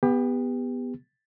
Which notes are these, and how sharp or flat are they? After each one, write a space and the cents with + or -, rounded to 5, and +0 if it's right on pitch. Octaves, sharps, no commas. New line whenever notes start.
B3 +0 G4 +30